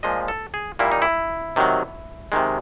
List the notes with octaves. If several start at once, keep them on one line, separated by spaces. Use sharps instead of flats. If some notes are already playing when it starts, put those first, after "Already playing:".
A#2 F3 G#3 D#5
A4
G#4
A#2 G3 A#3 E4
D#4
E4
C3 D#3 F#3
C3 D#3 G#3